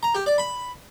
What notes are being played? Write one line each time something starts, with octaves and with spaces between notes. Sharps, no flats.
A#5
G4
D5
B5